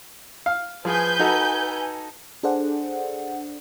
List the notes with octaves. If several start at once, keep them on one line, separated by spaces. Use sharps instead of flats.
F5
F3 G#4 B4 G#5 G6
D#4 F#4 A4
D4 G#4 A4 C5 D5 F#5